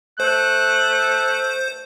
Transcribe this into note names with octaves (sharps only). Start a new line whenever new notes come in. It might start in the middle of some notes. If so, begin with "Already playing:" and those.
A3 C5 F#6